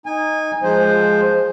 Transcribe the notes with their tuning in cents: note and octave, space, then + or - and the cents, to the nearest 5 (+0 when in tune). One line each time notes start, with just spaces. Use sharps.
D#4 +0 G#5 -20
F3 +0 G#3 +0 C5 +0